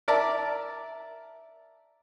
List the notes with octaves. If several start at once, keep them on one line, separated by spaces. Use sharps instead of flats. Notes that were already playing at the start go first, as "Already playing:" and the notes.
A#4 D5 E5 A5